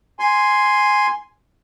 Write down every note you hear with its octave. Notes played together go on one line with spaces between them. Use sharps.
G#5 C6